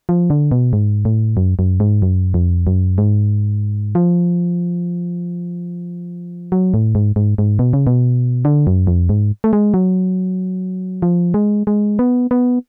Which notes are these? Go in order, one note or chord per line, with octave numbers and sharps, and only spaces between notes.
F3
D3
B2
G#2
A2
F#2
F#2
G#2
F#2
F2
F#2
G#2
F3
F#3
A2
G#2
G#2
G#2
B2
C#3
B2
D3
F#2
F2
G#2
A3
G#3
F#3
F3
G#3
G#3
B3
B3